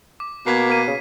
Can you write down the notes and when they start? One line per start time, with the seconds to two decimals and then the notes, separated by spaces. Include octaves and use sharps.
0.20 D6
0.47 B2 A#3 G#6 B6 C7
0.70 A#3 B6 D#7
0.88 C#3